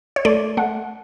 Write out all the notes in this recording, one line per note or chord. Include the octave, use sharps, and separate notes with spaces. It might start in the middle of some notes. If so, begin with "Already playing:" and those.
C#5
A3 D5
A3 F#5